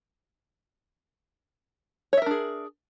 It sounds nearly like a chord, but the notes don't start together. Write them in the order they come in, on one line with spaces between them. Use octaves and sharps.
C#5 E5 A#4 D4 G#4